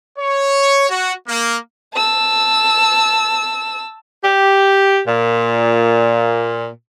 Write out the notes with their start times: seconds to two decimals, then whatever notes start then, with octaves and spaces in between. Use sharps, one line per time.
0.18 C#5
0.90 F#4
1.28 A#3
1.94 A5 E6
4.24 G4
5.07 A#2